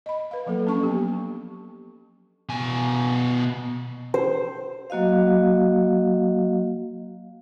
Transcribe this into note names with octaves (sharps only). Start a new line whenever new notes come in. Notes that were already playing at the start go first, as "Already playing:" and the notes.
D#5 B5
B4 F5
F3 F#3 A#3 A4
C#4 D4 A4 A5 C#6
F#3 B3 G4
B2 G#5
C5
F#3 A#3 F#4 D#5 F5